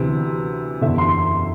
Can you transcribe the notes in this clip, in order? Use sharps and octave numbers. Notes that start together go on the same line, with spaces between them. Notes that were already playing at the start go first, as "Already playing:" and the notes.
Already playing: D2 C3 E3
F#1 E2 D3 E5
C6